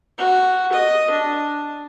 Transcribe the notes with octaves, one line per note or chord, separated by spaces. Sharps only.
F#4
D#5
D4